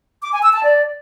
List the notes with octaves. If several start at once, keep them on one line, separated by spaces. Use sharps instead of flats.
D6
G#5
E6
A5
D5